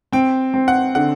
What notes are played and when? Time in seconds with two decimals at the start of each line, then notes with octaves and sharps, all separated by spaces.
0.13 C4 G5
0.54 C4
0.68 F#5
0.95 D3 F#5